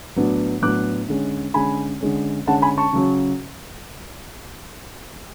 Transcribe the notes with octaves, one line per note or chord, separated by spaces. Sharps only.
A2 F#3 B3 D4
A2 F#3 B3 D4 D6 F#6
D3 G#3 C#4
D3 G#3 C#4 G#5 B5
D3 G#3 C#4
D3 G#3 C#4 F#5 A5
G#5 B5
A5 C#6
C#3 F#3 C#4